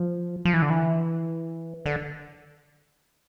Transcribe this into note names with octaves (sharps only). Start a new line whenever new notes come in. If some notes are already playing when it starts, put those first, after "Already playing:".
Already playing: F3
F3
E3
D3
E3
D3